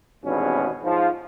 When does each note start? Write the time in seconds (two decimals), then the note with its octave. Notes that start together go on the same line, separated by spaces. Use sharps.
0.24 G#1 E2 G2 B2 C#4
0.83 G#2 F3